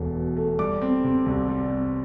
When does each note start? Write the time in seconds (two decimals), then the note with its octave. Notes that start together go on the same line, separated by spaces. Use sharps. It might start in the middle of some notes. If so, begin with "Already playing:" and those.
Already playing: E1 E2 A3
0.15 B2
0.37 A3
0.59 G3 D6
0.82 C4
1.04 C3
1.26 C2
1.48 G3
1.70 C4